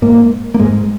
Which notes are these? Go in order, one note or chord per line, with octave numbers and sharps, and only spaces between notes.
G#2 A#3
A#3
G#2 G#3